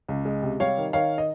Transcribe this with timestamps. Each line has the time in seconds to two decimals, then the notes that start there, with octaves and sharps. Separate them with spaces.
0.08 C#2
0.25 G#3
0.43 C3
0.60 G3 C#5 F5
0.77 D#3
0.93 D#3 C#5 F5
1.18 D#5